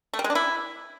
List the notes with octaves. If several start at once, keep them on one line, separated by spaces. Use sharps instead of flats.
A3
G3
G#3
D4
E4